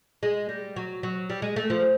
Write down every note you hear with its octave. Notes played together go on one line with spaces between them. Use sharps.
G#3
G3
F#3
F#3
G3
G#3
A3
F3